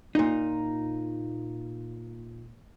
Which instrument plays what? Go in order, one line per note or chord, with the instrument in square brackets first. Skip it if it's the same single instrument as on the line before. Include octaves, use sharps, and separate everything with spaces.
[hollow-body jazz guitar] A#2 D#4